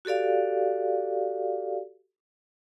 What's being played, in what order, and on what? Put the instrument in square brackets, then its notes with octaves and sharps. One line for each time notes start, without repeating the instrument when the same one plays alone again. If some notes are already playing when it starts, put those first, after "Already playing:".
[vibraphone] F#4 G4 A4 D5 F5